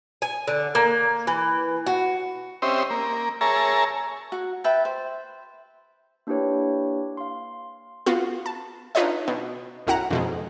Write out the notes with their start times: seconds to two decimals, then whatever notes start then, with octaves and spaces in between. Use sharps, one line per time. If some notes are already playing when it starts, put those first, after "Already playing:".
0.22 G#5
0.48 D3
0.75 A#3
1.27 E3
1.86 F#4
2.62 C4 C#4 G4 C5 D#5 E5
2.90 A#3
3.41 G#4 A#4 C#5 E5 A5 A#5
4.32 F#4
4.64 B4 E5 G5 A5
4.85 C5
6.27 A#3 D4 E4 G4 B4 C#5
7.17 F5 C6
8.06 B3 F4 F#4
8.46 A5
8.95 D4 D#4 F4 B4 C#5 D#5
9.28 B2
9.87 B1 F#2 E4 F#4 F#5 A#5
10.11 F2 B2 G#3